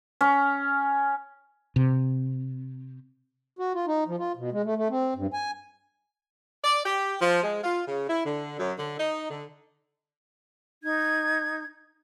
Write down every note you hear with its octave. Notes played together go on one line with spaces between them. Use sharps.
C#4
C3
F#4
F4
D#4
F3
F4
B2
G#3
A3
A3
C4
G2
G#5
D5
G4
F3
G#3
F4
C#3
E4
D3
F#2
D3
D#4
D3
D#4 G#6